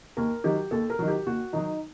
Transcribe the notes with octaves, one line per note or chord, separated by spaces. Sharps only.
D#2 A#4
D#3 F#3 G4
D#2 A4
A#4
D#3 F#3
G4
D#2 F#4
D#3 F#3 D#4